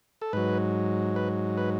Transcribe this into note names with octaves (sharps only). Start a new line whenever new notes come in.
A4
G#2 F#3 B4
B4
B4